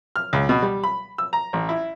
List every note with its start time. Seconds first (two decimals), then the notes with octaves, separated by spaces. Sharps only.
0.16 F6
0.33 C#2
0.49 B2
0.62 G3
0.84 B5
1.18 E6
1.33 A#5
1.53 A1
1.69 E4